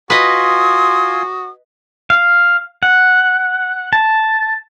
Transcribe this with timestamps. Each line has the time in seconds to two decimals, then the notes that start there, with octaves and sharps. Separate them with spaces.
0.10 F4 F#4 B4 D#5 G#5 C6 D#6
2.10 F5
2.83 F#5
3.93 A5